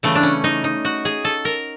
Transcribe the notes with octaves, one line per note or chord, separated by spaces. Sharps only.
C#3 E3 G3 A3
D4
C#4
D#4
D#4
F#4
G#4
A4
A#4